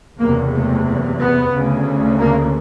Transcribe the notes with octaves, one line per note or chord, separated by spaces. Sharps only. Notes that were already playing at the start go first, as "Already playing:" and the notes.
F#1 E2 C3 A#3
A3
B3
D2 C#3
A#3